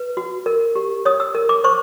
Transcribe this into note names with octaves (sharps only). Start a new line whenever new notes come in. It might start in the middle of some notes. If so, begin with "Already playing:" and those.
Already playing: B4
F#4
A#4
G4
C#5 D#6
E6
A#4
D6
C5 C#6